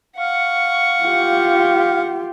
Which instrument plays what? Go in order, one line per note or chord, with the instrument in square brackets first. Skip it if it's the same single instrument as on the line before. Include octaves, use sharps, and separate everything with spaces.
[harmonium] F5 [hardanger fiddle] F#5 C#6
[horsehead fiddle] F4 G4